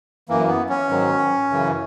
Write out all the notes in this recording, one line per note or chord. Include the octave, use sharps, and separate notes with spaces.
F#2 E3 A#3
B3
C#4
G#2 D#3 F#3
F#2 C#3 E3